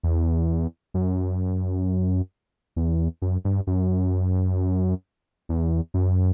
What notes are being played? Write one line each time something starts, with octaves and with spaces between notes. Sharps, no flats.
E2
F#2
E2
F#2
G2
F#2
E2
F#2